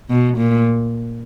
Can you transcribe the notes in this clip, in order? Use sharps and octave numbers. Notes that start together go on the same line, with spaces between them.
B2
A#2